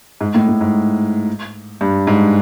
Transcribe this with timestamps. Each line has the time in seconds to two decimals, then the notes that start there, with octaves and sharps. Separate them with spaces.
0.21 G#2
0.34 A2
0.48 A2
0.61 G#2
1.81 G2
2.07 G#2